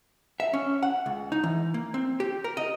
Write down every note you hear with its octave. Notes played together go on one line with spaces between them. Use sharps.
E5
C#4
F#5
C#2
D#4
E3
A#3
C4
G4
A#4
D#5